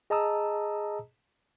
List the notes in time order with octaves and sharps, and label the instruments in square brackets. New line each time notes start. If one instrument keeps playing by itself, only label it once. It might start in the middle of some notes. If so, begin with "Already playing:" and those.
[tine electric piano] G#4 D#5 A5 A#5 D#6 E6